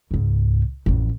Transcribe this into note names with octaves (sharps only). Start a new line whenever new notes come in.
C#2 G#2
A1 F2